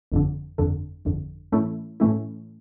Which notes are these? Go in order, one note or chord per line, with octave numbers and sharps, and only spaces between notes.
G1 F2 D3
G1 F2 D3
G1 F2 D3
A2 E3 A3 C#4 E4
A2 E3 A3 C#4 E4